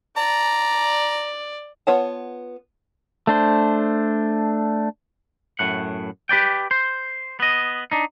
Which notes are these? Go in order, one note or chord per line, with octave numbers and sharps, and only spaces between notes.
D5 A#5
B3 F4 C#5 F#5 A5
A3 D4 C5
F#2 A2 F#5
G4 B4 D5 G5
C5
B3 D#5
D4 D#4